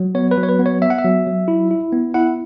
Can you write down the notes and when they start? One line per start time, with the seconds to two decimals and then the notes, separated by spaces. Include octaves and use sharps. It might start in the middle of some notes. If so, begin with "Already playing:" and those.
Already playing: F#3
0.15 B3 C#5
0.31 B4
0.37 F#3
0.43 C#5
0.49 B4
0.59 B3
0.66 C#5
0.82 B3 E5
0.90 F#5
0.98 E5
1.04 F#3
1.27 F#3
1.48 E4
1.71 E4
1.92 B3
2.14 E4 F#5